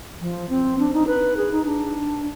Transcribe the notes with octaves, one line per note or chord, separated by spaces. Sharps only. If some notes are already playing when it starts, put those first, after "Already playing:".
F3
C4
D4
D#4
B4
G#4
D#4
D4